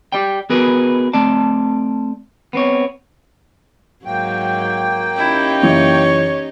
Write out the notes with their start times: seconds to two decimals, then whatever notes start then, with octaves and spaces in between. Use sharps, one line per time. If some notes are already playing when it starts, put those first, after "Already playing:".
0.12 G4 D5 G5
0.50 B3 F#4 G#4 A#4 B4
1.13 A3 C4 D5 A5
2.53 B3 C4 C#5
4.05 G#2 F#3 A#3 G5
5.16 C#4 D#4 E4 G4
5.62 F#1 E3 C#5 E5